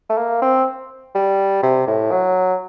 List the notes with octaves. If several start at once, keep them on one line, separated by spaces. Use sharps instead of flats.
A3
A#3
C4
G3
C3
A2
F#3